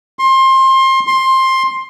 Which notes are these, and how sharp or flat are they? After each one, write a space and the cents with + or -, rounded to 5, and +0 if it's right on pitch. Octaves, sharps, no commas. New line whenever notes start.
C6 +25
C6 +15